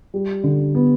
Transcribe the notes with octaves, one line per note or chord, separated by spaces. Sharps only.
G3
D3
B3